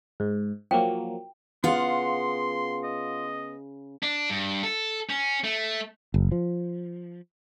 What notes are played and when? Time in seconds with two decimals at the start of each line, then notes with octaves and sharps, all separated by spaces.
0.20 G#2
0.71 F3 F#3 A#3 G5
1.64 C#3 B3 F4 F5 F#5 C6
2.84 D#5
4.03 D4
4.30 G2
4.63 A4
5.09 C#4
5.44 A3
6.14 F#1
6.32 F3